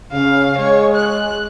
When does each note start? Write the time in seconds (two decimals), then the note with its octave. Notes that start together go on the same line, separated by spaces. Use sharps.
0.12 C#3 F5
0.59 G#3 C#5
0.96 F#6